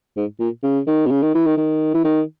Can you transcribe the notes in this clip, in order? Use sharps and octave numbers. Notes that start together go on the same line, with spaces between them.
G#2
A#2
C#3
D#3
B2
C#3
D#3
E3
D#3
D#3
E3
D#3